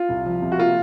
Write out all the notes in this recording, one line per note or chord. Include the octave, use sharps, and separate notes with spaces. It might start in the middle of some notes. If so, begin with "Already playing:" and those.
Already playing: F4
C2
F3
C3
F#4
A#3 F4